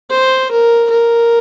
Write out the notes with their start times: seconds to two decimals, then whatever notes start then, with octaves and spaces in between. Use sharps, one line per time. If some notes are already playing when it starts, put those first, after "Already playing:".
0.11 C5
0.51 A#4
0.91 A#4